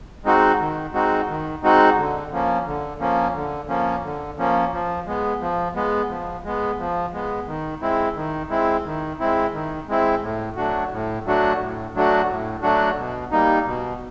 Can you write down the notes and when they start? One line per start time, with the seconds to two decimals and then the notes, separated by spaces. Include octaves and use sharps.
0.24 G#3 C4 D#4 F#4
0.59 D#3
0.93 G#3 C4 D#4 F#4
1.28 D#3
1.63 G#3 C4 D#4 F#4
1.97 D3
2.31 F3 A#3 C#4
2.66 D3
3.00 F3 A#3 C#4
3.34 D3
3.68 F3 A#3 C#4
4.03 D3
4.38 F3 A#3 C#4
4.73 F3
5.06 G#3 B3
5.41 F3
5.75 G#3 B3
6.09 F3
6.44 G#3 B3
6.79 F3
7.13 G#3 B3
7.47 D#3
7.82 G#3 C4 E4
8.15 D#3
8.50 G#3 C4 E4
8.85 D#3
9.20 G#3 C4 E4
9.53 D#3
9.88 G#3 C4 E4
10.22 A2
10.57 F#3 A3 D4 F#4
10.91 A2
11.26 F#3 A3 D4 F#4
11.59 A2
11.95 F#3 A3 D4 F#4
12.29 A2
12.62 F#3 A3 D4 F#4
12.97 B2
13.32 G3 A#3 D#4
13.66 B2